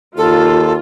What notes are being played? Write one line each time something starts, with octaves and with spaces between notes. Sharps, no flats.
D#2 F4 A4